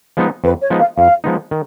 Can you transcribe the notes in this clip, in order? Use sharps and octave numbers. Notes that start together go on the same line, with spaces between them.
F3 G#3 B3 D#4
F2 B4
C#5
F3 G#3 B3 D#4
F5
F2 F5
F3 G#3 B3 D#4
D#3